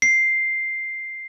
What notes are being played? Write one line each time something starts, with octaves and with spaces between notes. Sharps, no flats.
C7